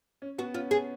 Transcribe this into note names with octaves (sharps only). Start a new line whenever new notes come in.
C#4
B3 F#4
C#4 F4
C#4 G#4